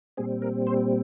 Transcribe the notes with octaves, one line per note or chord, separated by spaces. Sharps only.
A#2 G3 C4 G#4
A#4
C5